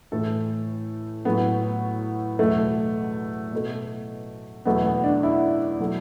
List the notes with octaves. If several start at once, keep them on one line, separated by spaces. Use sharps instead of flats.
A2 E3 A3 A4
A2 F#3 A3 B3
E2 B2 F#3 A3
B2 A3
E2 B2 F#3 A3 B3
B3
D4
E4
B2 F#3 A3